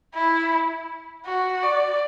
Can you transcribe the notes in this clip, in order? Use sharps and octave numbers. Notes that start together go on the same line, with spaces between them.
E4
F#4
D5